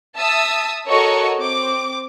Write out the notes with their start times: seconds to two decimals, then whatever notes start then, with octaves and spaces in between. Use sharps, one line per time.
0.16 E5 A5 D#6 E6
0.88 F#4 A4 A#4 C#5 D#5 C#6
1.38 C4 D6